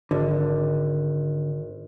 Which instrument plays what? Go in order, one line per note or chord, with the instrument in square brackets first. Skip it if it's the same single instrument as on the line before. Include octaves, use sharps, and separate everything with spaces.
[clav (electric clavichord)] G#1 [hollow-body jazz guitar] D3